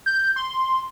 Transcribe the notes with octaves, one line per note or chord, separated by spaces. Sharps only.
G6
C6